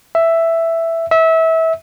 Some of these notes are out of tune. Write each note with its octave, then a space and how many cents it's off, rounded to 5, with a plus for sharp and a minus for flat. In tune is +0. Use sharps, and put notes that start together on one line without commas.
E5 +5
E5 -25